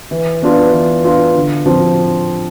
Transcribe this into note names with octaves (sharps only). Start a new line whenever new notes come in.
E3
B3 D4 F4
E3
B3 D4 F4
D3
F3 C4 F4